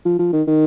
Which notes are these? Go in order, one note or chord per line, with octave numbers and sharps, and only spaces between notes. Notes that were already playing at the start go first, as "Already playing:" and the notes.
F3
F3
D#3
D#3